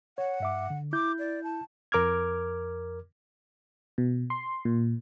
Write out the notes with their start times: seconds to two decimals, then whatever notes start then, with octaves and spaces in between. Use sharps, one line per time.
0.18 C#5 F#5
0.40 G2 E5 D6
0.70 D3
0.93 E4 D6 G6
1.19 D5
1.44 A5
1.92 F2 A#4 D6 F6 G#6
3.98 B2
4.30 C6
4.65 A#2